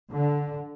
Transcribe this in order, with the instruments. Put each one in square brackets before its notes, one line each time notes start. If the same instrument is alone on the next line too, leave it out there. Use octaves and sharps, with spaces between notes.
[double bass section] D3